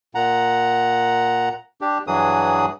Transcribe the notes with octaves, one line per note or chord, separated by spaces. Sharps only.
A#2 F#5 A#5
D4 G4
G2 E3 F#3 G#4 D#6